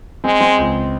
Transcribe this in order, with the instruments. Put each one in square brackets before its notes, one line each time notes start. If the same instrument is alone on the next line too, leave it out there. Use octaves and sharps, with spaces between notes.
[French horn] G#3 [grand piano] C4
[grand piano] C4
C#2